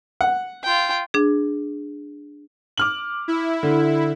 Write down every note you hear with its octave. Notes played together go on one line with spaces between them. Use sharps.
F#5
F4 G5
D4 G#4
D6 F6 F#7
E4
D3